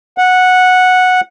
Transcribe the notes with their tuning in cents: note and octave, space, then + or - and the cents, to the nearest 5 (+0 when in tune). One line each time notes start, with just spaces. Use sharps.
F#5 -10